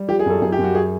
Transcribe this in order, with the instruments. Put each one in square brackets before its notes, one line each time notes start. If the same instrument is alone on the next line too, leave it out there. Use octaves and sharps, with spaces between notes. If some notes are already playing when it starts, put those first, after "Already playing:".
Already playing: [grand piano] G3
F3 G4
G#4
F#2 A4
F#2 G#4
G4
F#2
F#4
G#4